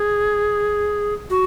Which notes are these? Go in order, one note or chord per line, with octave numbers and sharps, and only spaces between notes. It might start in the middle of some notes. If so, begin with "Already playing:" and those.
Already playing: G#4
F#4